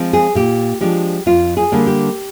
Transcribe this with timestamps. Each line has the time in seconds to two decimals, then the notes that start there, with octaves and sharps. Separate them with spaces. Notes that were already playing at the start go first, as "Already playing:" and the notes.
Already playing: F3 G#3 C4
0.13 G#4
0.35 A#2 G4
0.81 F3 G#3 D4 G4
1.26 F2 F4
1.57 G#4
1.72 D3 G3 A#3 D4
1.87 G4